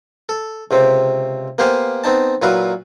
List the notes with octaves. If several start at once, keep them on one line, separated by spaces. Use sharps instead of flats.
A4
C#2 C3 C4
A#3 B3 G4 C5 F5 G#5
B3 C4 D#4 A5
A#2 F#3 E4 F#4 B4 F5